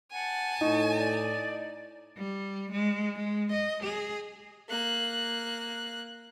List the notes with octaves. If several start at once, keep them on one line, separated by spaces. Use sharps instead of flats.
F#5 G#5 A5
A2 D#4 C#6
D5
G3
G#3
G#3
D#5
G#4
A#3 F#6